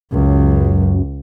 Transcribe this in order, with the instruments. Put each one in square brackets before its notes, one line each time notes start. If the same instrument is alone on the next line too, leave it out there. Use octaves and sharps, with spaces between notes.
[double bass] C#2 [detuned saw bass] F#2